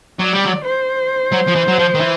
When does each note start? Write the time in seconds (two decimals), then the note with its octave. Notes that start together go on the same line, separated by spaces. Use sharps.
0.19 F#3 D5
0.33 G3
0.46 F#3
0.64 C5
1.33 F#3
1.48 F3
1.56 E3
1.68 F#3
1.79 F3
1.95 D#3
2.01 E3